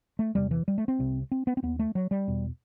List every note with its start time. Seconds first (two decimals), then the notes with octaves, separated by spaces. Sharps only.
0.19 A3
0.35 E2 C3 G3
0.51 E3
0.68 G3
0.78 A3
0.88 C4
0.99 C2 C3
1.31 C4
1.47 B3
1.57 C4
1.63 D#2 B3
1.79 A3
1.95 F#3
2.11 G3
2.27 E2 B2